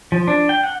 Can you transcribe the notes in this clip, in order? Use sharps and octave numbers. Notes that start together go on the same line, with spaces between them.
F3
D4
G5
F#5